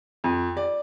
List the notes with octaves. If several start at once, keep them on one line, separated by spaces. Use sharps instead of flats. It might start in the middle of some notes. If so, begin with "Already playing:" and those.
F2
D5